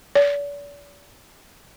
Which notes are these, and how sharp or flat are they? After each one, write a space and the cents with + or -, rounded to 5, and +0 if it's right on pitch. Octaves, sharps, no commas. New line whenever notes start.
D5 -40